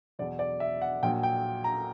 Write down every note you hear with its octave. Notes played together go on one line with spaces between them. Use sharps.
E2 B2 F#3 D5
D5
E5
F#5
A#1 A#2 F#3 G5
G5
A#5